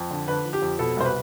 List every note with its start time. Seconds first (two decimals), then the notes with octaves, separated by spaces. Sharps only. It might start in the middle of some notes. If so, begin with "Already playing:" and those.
Already playing: F2
0.11 D3
0.28 D3 B4
0.45 F3
0.53 G4
0.62 F2
0.79 B2 A4
0.97 C2 C5
1.05 B4